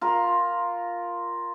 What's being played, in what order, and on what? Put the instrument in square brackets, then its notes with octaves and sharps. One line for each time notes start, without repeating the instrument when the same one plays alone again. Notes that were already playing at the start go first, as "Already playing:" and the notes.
[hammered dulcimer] F4 A#4